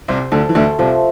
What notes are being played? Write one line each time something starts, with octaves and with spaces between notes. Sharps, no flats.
C2 C3 C5
D2 D3 A4
E3
D2 D3 A3
C2 C3 F3